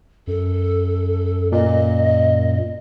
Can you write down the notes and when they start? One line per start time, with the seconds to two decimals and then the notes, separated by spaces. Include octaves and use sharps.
0.27 F#2 A4
1.52 A#2 D#5